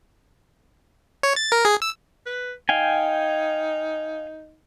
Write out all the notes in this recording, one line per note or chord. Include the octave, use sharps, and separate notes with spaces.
C#5
A6
A#4
G#4
E6
B4
D#4 F5 G5 G#5